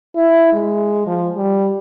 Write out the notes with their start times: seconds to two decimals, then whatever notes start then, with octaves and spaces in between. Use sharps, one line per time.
0.16 E4
0.53 G#3
1.06 F3
1.36 G3